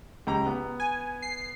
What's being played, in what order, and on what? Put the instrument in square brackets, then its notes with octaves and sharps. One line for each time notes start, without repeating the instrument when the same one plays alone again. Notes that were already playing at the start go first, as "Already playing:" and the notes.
[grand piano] C#2 G4 A#5
B3
[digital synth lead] G#5
C7